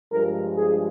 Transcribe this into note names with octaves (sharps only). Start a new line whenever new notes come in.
G2 F3 G#3 A#4
G#4